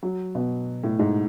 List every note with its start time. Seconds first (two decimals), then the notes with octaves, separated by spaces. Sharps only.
0.03 F#3
0.35 B2
0.83 A2
0.99 G#2